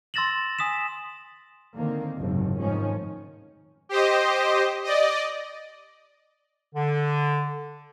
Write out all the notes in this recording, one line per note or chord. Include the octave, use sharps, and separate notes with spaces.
C6 E6 A6 A#6 E7 F#7
G#5 D#6 B6 E7
D3 D#3 A#3 C4
F#1 D#2 G#2 C3
F1 G#2 D#3 F3 C#4
G4 C5 D#5
D5 D#5
D3